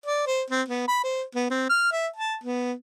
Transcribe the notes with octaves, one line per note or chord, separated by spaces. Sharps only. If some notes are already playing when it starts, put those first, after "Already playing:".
D5
C5
C4
B3
B5
C5
B3
C4
F6
E5
A5
B3